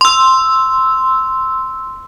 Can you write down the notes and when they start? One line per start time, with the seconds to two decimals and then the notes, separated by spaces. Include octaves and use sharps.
0.01 C6 E6